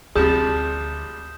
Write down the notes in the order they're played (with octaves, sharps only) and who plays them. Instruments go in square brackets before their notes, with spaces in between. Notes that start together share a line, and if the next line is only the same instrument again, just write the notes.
[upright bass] D2 [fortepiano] C3 F3 G3 [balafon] G#4 [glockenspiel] D#6 G6 E7